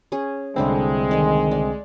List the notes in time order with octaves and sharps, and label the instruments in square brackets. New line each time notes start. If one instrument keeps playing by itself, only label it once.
[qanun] C#4 G#4
[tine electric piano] C2 D3 C4 [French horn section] G#3 [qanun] A3 D4 E4
[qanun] D#3 D5
D5